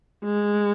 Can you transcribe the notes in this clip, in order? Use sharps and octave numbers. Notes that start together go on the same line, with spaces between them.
G#3